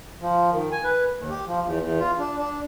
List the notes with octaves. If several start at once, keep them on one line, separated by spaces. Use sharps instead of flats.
F3
D#3
G#5
B4
D#2
G4
F3
E2
E2
F4
D4
D4